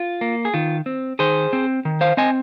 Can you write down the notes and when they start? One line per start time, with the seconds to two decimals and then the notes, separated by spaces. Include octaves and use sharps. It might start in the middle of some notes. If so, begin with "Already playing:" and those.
Already playing: F4
0.21 A#3
0.45 G#4
0.54 D#3 F4
0.86 C4
1.19 D#3 G#4 C5
1.53 C4
1.85 D#3
2.01 C5 F5
2.17 C4 D#5 G#5